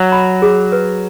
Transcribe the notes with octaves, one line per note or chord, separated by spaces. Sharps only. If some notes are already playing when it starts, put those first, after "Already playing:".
Already playing: F#3
B5
G#4
B4